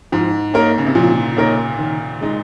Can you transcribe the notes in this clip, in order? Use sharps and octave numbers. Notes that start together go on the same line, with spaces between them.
G#2 F3
A#3 D#4 A#4 C#5
C#3
C3
A#2 F3
A#3 D#4 A#4 C#5
D#3
G#3 D#4